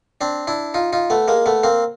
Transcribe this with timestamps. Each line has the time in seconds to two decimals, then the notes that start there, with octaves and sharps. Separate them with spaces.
0.21 C4 D4
0.47 D4 E4
0.74 D#4 F4
0.93 D#4 F4
1.10 A3 B3
1.28 G#3 A#3
1.46 A3 B3
1.63 A#3 C4